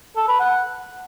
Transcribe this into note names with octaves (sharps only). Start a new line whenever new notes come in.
A4
B4
F#5